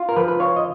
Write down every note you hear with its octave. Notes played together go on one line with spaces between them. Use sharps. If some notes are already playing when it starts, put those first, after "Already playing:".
Already playing: F4
A#4
F3 B4
B4
F4 C#5
D#5